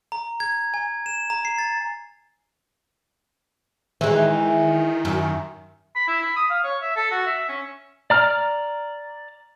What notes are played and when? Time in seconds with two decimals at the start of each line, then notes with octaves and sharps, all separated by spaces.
0.12 A#5
0.40 G#6
0.74 G#5
1.06 E7
1.30 A#5
1.45 C7
1.58 A6
4.01 D#3 E3 G#3
5.05 F#2
5.95 B5
6.08 E4
6.22 B5
6.36 D#6
6.50 F5
6.64 C#5
6.82 E5
6.96 A4
7.11 F#4
7.26 E5
7.49 C#4
8.10 D5 A#5 F6